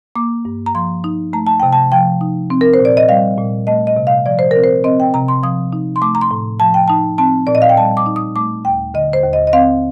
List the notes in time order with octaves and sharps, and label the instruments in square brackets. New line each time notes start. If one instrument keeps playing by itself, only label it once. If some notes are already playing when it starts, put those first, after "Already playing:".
[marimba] A#3 D6
G2
A#5
F3 C6
D#4
A3 A#5
A5
C3 G5
A5
F3 G5
D#4
C4
A#4
C5
A#2
D5
D#5
G3 F5
A#2
A3 D#5
D#5
C3
F5
F3 D5
C5
C4 A#4
C5
C4 D#5
G5
C3 A#5
C6
F3 D#6
D#4
C6
A3 D6
A#5
C6
A2
F3 A5
G5
D#4 A5
C4 A5
A#2 D5
D#5
F5
G5
G3 A5
D6
D#4
D#6
A3 D6
D#2 G5
D3 D#5
C5
D#2
D#5
D#5
C4 F5